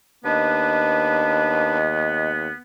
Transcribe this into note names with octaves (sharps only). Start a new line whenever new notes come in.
D#2 B3 D4 B4 D#5